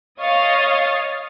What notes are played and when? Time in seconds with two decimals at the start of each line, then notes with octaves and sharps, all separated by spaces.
0.20 C#5 D#5 F5 C#6 D#6 A6